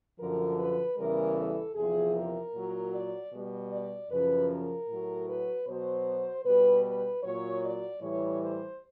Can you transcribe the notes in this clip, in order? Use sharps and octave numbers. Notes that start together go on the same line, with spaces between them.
F#2 D3 F3 A#4
B4
E2 C#3 E3 G3 A#4
A4
E2 C3 F3 G#4
A#4
A#2 F#3
D5
B2 G3
D5
F#2 C#3 F3 B4
A#4
A2 F#3
B4
B2 F#3 C5
B2 G3 B4
B4
A#2 F#3 C#5
D5
A2 E3 G3 C#5
C5